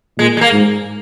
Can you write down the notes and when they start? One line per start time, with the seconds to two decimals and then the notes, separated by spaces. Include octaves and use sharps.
0.18 A#2 G#3
0.37 G#3
0.41 A#3
0.52 G#2